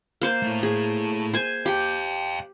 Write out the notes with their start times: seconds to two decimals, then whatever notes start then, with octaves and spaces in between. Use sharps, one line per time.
0.21 A#3 C5 D6
0.42 A3 E4
0.63 G#4
1.34 C5 G#5
1.66 G4 F5 G5